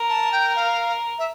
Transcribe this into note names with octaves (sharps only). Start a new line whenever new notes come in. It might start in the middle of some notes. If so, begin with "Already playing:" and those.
Already playing: A#4
A5
G5
F5
E5